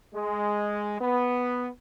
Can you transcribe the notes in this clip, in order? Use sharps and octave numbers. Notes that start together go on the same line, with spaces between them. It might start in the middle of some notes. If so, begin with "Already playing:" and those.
G#3
B3